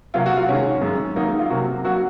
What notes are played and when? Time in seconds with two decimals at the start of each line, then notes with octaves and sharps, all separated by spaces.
0.14 C3 F#3 A#3 F4
0.26 F#4
0.37 F4
0.48 C3 D#3 G#3 C#4
0.81 F#2 D#3 G#3
1.16 G#2 D#3 F#3 A#3 D#4
1.39 F4
1.50 C3 F#3 A#3 F#4
1.85 F#3 A#3 F#4